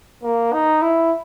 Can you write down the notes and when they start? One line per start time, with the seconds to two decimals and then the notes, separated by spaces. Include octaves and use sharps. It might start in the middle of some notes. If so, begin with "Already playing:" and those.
0.23 A#3
0.53 D#4
0.82 E4